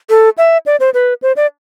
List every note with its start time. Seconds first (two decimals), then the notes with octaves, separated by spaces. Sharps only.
0.10 A4
0.38 E5
0.66 D5
0.80 C5
0.94 B4
1.23 C5
1.37 D5